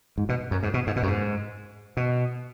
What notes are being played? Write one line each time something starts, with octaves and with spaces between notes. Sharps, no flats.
G#2
B2
F#2
G#2
B2
G#2
B2
F#2
G#2
B2